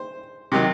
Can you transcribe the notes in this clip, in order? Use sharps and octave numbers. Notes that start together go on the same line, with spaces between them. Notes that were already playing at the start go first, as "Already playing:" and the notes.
Already playing: C5
C3 D#3 F#3